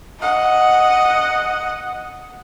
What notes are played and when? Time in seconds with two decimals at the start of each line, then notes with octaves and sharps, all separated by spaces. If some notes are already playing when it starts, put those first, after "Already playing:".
0.20 D#5 F#5